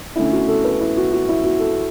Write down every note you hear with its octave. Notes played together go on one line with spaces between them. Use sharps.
D3 A3 C#4 E4
F#4
A4
B4
E4
F#4
F#4
E4
F#4
A4